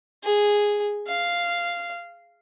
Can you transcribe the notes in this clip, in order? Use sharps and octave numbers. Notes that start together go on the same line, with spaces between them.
G#4
F5